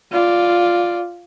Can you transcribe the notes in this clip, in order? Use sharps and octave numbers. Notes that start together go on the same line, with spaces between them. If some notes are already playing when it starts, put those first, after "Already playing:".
F4 D5